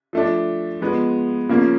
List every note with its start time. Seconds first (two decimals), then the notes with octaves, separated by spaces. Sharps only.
0.13 F3 A3 D4
0.81 F3 G#3 B3
1.49 C#3 F3 A#3 C#4